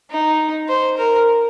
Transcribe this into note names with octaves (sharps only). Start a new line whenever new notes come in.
D#4
C5
A#4